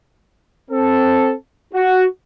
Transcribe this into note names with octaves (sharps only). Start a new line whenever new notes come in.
C4 A4
F#4